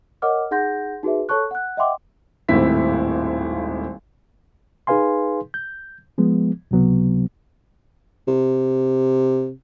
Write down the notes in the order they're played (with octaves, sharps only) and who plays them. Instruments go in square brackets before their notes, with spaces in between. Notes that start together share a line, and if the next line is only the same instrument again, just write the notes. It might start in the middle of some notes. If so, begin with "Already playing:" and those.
[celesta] A#4 C#5 D#5 F#5 D6 F6
D#4 G#4 F#5 C6 G6 A#6
D#4 F#4 G#4 B4 E5
A4 C#5 A5 C#6 F#6
F#5 F#6
D#5 E5 F#5 G5 C6 D6
[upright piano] D#1 G#1 A2 C4 E4 B6
[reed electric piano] D#4 G#4 B4 F5 G#5 C6
G6
F3 G#3 B3
C#2 C3 F#3 B3
[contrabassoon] C3